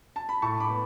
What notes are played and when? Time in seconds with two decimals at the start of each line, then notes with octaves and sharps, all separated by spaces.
0.16 A5
0.29 B5
0.42 A2 A5 C#6
0.60 B5 D6
0.69 B3